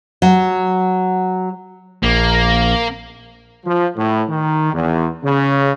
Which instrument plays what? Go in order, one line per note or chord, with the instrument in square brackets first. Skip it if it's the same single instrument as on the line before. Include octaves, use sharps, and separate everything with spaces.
[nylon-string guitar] F#3
[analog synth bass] A#1 [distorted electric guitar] A#3
[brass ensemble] F3
A2
D#3
E2
C#3